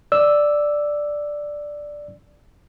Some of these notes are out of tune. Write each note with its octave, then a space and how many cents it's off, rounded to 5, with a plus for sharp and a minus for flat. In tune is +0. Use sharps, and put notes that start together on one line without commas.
D5 +0 E6 +0